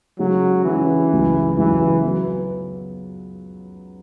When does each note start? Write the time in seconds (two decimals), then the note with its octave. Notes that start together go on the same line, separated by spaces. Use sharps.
0.19 C#3 F#3 G#3 C#4 G#4
0.64 C#3 E3 G#3 C#4 G#4
1.11 C#2 C#3 F#3
1.57 C#2 C#3 E3 F#3
2.03 F#3 B3